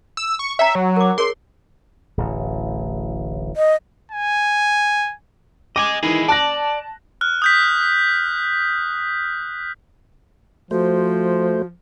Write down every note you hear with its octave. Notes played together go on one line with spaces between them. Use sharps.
E6
C#6
C#5 E5 G5 A#5
F#3
A#4 D6
G#4 A#4 C#5 C6
D1 A1
D#5
G#5
D#5 G5 G#5 D6
D#3 E3 E4 G#4 D#5
D5 A5 F#6 A#6
F6 F#6
D#6 G6 B6
F3 A3 F#4 C5